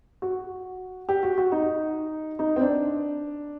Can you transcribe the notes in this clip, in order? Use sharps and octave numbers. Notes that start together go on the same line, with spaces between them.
F#4
G4
F#4
F#4
D#4
D#4
C4
D4